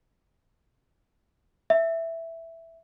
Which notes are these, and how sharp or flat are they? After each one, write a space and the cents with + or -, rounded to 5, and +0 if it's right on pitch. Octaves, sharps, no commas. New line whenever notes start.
E5 +0